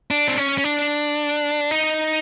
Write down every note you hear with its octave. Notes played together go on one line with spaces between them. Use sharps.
D4
C4
C#4
C#4
D4
D#4